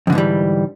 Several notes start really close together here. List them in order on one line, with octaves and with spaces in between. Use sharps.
F2 D3 G#2 E3 G3